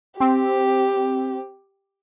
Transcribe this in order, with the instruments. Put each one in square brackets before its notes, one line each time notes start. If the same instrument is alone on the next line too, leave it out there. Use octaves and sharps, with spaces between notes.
[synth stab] C4 [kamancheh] G4